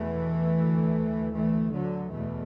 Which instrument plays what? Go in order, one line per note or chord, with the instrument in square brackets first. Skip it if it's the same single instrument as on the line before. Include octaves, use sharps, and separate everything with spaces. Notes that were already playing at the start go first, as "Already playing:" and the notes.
Already playing: [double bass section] E2 B2 E3 A3
D2
D2 E3 A3
D3 F#3
E2 B2 E3 A3